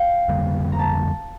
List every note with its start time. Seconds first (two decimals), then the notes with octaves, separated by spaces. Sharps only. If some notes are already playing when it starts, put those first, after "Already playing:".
Already playing: F5 G5
0.28 F2 D3 G3 A#3
0.72 A#5
0.79 A5